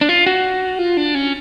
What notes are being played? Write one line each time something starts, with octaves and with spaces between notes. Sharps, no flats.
D4
F4
F#4
F4
D4
C#4